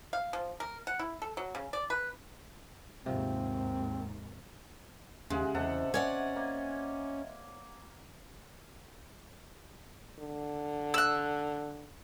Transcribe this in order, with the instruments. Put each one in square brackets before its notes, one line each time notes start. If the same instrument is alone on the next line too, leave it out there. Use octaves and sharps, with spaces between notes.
[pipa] F5
F3
A#4
F#5
E4
A4
F#3
C#3
D5
B4
[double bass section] D#2 G#2 [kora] C3 F3 [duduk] C4
[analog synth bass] D#2 [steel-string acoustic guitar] C#3 [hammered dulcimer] G#3 [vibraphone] G4 E5 F#5
[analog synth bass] E2 [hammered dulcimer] C3 A4 F#5 [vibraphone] D#5 E5
[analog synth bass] C#4 [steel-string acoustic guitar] C#5 D5 F#5 [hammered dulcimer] G#5
[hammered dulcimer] A#3
[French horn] D3
[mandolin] E6 F#6